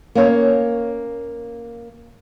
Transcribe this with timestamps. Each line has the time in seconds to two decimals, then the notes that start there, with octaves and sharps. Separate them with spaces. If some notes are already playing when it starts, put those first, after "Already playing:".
0.15 A#3 C#4 C#5